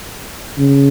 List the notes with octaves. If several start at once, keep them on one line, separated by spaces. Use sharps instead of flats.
C#3